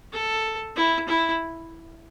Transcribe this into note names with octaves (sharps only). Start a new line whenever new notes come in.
A4
E4
E4